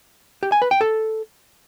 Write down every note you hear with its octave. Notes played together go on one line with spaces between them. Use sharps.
G4
G#5
B4
G5
A4